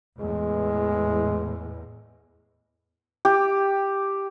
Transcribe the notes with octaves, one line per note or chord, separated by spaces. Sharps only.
E2 A2 G#3
G4